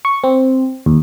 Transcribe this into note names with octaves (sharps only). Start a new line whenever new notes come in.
C#6
C4
D#2